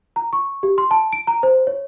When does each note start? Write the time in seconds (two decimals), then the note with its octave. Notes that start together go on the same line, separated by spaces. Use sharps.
0.16 A#5
0.33 C#6
0.63 G4
0.78 C6
0.91 A5
1.13 D7
1.27 A#5
1.43 C5
1.67 C#5